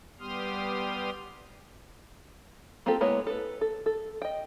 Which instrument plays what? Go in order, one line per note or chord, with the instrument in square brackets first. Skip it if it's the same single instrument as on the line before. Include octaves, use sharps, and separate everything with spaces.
[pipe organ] G3 B3 G4 C6 D#6 F6
[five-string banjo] A#3 C4 F4 G4 A4
G#3 A#3 B3 E4 C#5
A4 B4
A4
A4
D#5 G5